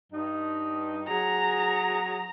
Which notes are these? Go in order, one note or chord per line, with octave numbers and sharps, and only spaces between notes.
G2 D#4
F#3 G#4 A#5